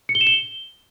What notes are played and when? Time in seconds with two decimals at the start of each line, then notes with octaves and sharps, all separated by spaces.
0.09 C#7
0.15 G7
0.21 E7
0.27 G7